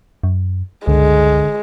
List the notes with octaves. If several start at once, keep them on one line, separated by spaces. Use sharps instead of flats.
F#2
G1 C#2 D3 G#3